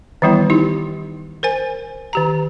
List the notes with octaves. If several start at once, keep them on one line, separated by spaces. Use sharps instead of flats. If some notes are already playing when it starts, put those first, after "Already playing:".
D#3 E3 G3 B3 E4
D#4 E4 G4
A#4 C5 G#5
D#3 G4 A#5